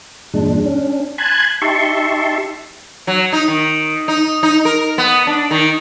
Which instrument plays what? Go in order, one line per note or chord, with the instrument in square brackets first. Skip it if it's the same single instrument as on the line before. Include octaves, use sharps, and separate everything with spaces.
[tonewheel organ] E2 G2 A#2 G#3 D4
C#4 D4
G#5 A5 B5 C6 F#6 G#6
D#4 G4 E5 A5 C6 C#6
[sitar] F#3
D#4
D#3
D#4
D#4
A#4
B3
D4
D#3